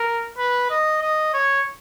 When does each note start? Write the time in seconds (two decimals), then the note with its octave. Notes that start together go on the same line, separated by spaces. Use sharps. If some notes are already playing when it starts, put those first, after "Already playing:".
Already playing: A#4
0.38 B4
0.70 D#5
1.02 D#5
1.34 C#5